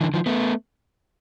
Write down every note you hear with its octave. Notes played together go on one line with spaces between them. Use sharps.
D3 E3
D#3 F3
A3 B3